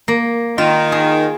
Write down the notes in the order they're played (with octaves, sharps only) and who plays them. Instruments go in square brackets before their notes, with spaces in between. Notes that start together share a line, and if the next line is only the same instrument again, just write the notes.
[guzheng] A#3
[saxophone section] D#3 [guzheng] F4
[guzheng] G#4